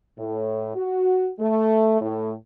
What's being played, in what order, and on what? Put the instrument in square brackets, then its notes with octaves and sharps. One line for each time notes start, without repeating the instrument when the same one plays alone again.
[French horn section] A2
F#4
A3
A2